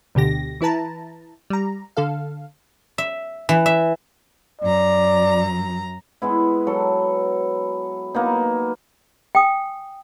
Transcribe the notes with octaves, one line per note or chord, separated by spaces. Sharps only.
D2 B2 D3 G4 A#6
E3 E4 B4 A5 A#5
G3 A#5
D3 A4 F5
E5
E3
E5
F#2 D5 A#5
G#3 B3 E4
F#3 A4
A#3 B3 D#4
G5 G#5 D#6